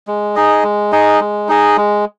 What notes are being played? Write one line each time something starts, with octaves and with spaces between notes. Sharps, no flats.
G#3
D#4 G#4 D#5
G#3
D#4 G#4 D#5
G#3
D#4 G#4 D#5
G#3